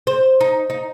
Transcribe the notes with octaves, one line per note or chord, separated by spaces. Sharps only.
C5
D#4
D#4